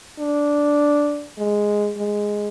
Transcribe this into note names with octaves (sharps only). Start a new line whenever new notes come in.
D4
G#3
G#3